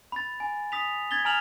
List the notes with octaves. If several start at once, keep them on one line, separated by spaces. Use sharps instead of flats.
B5 A6
G#5
D#6 B6 F7
G#6 A6 B6 G7
G#5 A#5 F6 F7 F#7